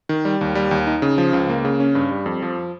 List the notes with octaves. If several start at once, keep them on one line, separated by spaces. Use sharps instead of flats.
D#3
G3
D#2
G3
D#2
D#4
C#3
F3
C#2
A#3
C#3
C#4
G2
G3
F2
F3